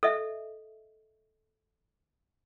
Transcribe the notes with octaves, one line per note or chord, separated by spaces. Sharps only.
A4 D#5 E5